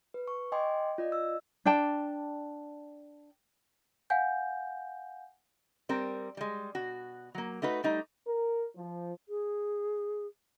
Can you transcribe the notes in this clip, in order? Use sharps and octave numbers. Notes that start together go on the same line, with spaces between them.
B4
C#6
D#5 G5 G#5 C6 D6
F4 D5 D#5
E6
D4 D5 G5 A5
F5 F#5 G#5 G6
G3 C4 A#4
G3 G#3
B2 F#4
F#3 A#3
A3 D#4 F#4 B4
G3 A3 D#4
A#4
F3
G#4